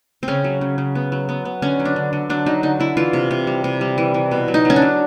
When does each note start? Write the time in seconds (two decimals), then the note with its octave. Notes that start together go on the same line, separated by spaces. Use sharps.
0.23 C4
0.28 C#3 C#4
0.44 F#3
0.61 C#3
0.78 C#3
0.95 B3
1.12 F#3
1.29 B3
1.45 B3
1.62 D3 C#4
1.80 F#3
1.85 D4
1.96 D3
2.13 D3
2.30 F#3 D4
2.46 F#3 D#4
2.63 D3 D#4
2.80 D3 E4
2.97 E3 F4
3.13 C3
3.31 C3
3.47 G3
3.64 C3
3.81 G3
3.98 E3
4.14 E3
4.31 B2
4.48 F#3
4.54 D#4
4.65 F#3 C#4
4.76 D4
4.82 F#3